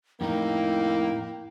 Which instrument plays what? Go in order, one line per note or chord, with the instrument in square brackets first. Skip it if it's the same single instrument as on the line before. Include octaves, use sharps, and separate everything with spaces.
[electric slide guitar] F2 A2 D#4 [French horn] A#3 [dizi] E4 [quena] G5